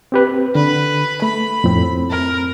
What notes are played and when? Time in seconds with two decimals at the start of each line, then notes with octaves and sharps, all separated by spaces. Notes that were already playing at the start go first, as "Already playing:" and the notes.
0.12 C4 G4 B4
0.55 D3 B4
1.22 A3 B5
1.64 F2 A2 C4
2.11 A#4